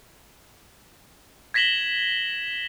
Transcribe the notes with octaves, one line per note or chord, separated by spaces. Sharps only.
G#6 A#6 B6 E7 F#7 G7